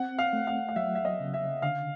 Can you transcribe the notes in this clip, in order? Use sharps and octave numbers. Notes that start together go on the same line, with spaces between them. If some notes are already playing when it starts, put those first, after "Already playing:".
Already playing: C4 F#5
F5
A3
F5
F5
F#3 E5
E5
D#5
C#3
E5
D3 F5